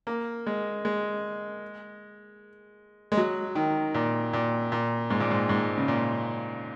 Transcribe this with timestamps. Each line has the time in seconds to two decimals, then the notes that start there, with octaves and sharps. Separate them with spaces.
0.07 A#3
0.47 G#3
0.85 G#3
3.12 G#3
3.17 F#3
3.55 D#3
3.94 A#2
4.33 A#2
4.72 A#2
5.10 G#2
5.20 A#2
5.31 G#2
5.49 G#2
5.77 C#3
5.88 A#2